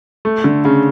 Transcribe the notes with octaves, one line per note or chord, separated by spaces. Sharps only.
A3
D3
C#3